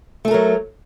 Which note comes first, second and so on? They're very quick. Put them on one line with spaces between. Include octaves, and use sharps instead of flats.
A3 A4 A#4 F#3